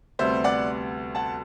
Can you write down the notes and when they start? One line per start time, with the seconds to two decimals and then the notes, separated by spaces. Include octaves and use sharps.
0.19 D2 C3 G3 B3 C5 E5
0.44 D5 F#5
1.15 F#5 A5